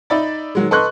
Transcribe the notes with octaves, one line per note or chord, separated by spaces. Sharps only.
D#4 D5 E5 B5 A6
D#3 F#3 G#3
A4 B4 D#5 C6 C#6 F#6